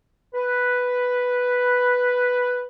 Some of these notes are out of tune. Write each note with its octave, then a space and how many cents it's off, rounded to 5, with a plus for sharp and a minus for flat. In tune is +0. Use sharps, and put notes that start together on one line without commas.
B4 +0